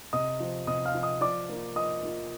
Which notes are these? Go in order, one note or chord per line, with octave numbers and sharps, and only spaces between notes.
C3 D#5 D#6
F3 C4
C3 D#5 D#6
F5 F6
F3 C4
D#5 D#6
F3 D5 D6
A#3 F4
F3 D#5 D#6
A#3 F4